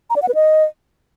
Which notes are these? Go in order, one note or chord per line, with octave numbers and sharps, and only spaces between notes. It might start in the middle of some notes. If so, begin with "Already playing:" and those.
A#5
D5
F#5
B4
D#5